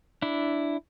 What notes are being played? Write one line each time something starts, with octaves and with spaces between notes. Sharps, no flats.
D4 E4